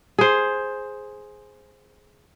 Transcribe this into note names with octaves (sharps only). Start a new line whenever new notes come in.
G#4 C5